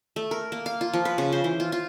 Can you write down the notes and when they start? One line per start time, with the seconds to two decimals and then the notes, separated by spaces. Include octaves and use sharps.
0.16 A3
0.31 A#4
0.52 A#3
0.66 F5
0.81 F4
0.93 F3
1.05 B4
1.18 C#3
1.32 C5
1.44 E3
1.60 F4
1.72 F4